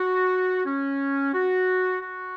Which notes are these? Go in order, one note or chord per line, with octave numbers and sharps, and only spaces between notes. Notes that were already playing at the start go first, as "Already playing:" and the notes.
Already playing: F#4
C#4
F#4
F#4